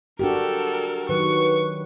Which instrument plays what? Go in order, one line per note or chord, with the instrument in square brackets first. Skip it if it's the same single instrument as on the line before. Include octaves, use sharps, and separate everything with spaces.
[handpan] D4 F#4 G4 [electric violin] A4 A#4
[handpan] D#3 F#3 [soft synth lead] B4 [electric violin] C#6